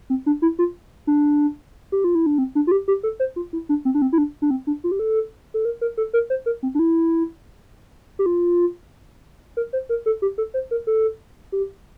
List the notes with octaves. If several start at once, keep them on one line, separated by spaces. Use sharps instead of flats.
C4
D4
E4
F4
D4
G4
F4
E4
D4
C4
D4
F4
G4
G4
A4
C5
F4
E4
D4
C4
D4
C4
E4
D4
D4
C4
D4
F4
G4
A4
A4
A#4
A#4
A4
A#4
C5
A#4
C4
D4
E4
G4
F4
A#4
C5
A#4
A4
G4
A4
C5
A#4
A4
G4